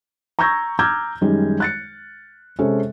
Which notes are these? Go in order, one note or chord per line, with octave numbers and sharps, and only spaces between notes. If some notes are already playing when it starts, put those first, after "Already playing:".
A#5 C#6 E6 G6 G#6 A#6
A#5 D6 E6 F6 G6 G#6
F#2 D#3 G3 G#3
F#6 A6 C#7
C3 G#3 C#4 A4